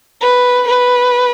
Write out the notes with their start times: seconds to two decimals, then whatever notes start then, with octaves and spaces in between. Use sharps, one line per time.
0.21 B4
0.68 B4